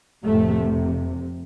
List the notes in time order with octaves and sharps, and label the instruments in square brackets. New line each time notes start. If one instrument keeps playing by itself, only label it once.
[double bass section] F1 F2 A2 C3 A3